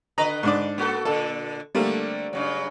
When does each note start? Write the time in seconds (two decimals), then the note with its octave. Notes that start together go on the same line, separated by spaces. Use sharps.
0.18 D3 B4 D#5 A#5
0.43 G#2 D4 D5
0.78 A#3 F#4 A4
1.05 A#2 D3 A4
1.75 D3 G3 A3 A#3 C4 D4
2.33 G2 C#3 F#3